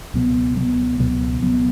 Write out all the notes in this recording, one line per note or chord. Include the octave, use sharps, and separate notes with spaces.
C#2 B2 F#3 B3
C#2 B2 F#3 B3
C#2 B2 F#3 B3
C#2 B2 F#3 B3